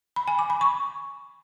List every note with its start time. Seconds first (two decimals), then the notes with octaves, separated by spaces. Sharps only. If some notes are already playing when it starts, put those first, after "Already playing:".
0.16 B5
0.28 G#5
0.39 D6
0.50 B5
0.61 C#6